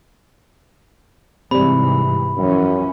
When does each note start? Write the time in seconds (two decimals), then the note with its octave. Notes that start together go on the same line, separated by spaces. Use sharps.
1.51 G#2 C3 E3 G3 B5
2.38 F#2 E3 F3 C#4